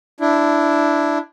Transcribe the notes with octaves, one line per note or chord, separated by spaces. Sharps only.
D4 E4